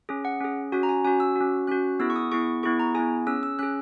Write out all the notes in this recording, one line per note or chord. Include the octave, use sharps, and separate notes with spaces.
C#4 G#4
F#5
C#4 G#4
C#4 F#4 G#5
A#5
G#5
C#4 F#4 G#5
E6
C#4 F#4
C#4 F#4 F#6
B3 E4 G#4 E6
C#6
D#6
B3 E4 G#4 C#6
B3 E4 G#4 C#6
A#5
B3 E4 G#4 G#5
C#4 G#4 E6
E6
C#4 G#4 F#6